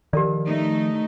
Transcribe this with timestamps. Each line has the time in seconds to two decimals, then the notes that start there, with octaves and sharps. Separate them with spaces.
0.13 D#3 F3 G4 A#4 D5
0.47 A3 D#4